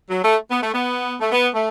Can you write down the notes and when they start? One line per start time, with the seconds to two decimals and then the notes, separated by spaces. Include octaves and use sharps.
0.10 F#3
0.24 A3
0.51 B3
0.62 A3
0.74 B3
1.20 A3
1.32 B3
1.54 A3